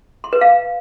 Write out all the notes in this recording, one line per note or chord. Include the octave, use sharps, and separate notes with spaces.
C6
B4
F5